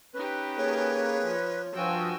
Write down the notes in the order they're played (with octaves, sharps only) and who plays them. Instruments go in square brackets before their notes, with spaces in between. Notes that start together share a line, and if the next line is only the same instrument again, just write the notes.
[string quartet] C#4 D#4 G4 [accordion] B4
[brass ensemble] A#3 G#4 [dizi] C#5
[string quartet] F3
[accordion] G2 F#4 [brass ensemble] F3 [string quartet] G5 G#5 E6